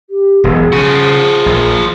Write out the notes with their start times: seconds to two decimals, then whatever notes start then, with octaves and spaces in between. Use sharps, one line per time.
0.10 G4
0.44 E1 B1 E2 G#4
0.72 C#3 F3 F#4
1.46 A#1